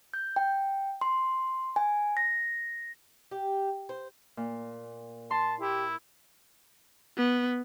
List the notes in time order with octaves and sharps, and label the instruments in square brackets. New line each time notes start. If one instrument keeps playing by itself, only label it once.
[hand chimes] G6
G5
C6
G#5
A#6
[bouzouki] G4
C5
[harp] A#2
[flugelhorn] A5 [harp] C6
[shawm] E4 [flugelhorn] G4
[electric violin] B3